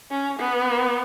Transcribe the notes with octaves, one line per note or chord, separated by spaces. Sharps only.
C#4
B3